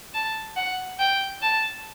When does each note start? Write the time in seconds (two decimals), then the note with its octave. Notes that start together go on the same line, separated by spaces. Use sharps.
0.14 A5
0.56 F#5
0.99 G5
1.42 A5